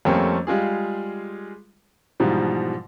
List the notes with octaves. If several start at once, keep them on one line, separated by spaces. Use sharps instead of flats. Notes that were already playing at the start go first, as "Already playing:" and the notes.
F2 G3 A3 A#3 C4 C#4
G3 G#3 F4 G#4
G#2 B2 E3 F3 G3